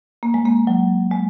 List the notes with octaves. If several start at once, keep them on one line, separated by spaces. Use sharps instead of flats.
A#3
G#3
A#3
F#3
G#3